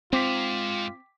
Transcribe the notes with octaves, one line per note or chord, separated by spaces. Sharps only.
G#2 C4 F4 G5 D6 B6